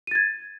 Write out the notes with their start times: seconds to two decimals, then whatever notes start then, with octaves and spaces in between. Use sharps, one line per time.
0.07 D#7
0.11 A6
0.15 G#6